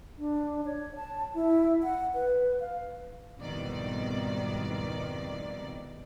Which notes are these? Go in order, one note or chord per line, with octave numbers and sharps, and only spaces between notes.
D4
C#5
A5
E4
F#5
B4
F5
C2 F2 G#2 B2 D#3 D5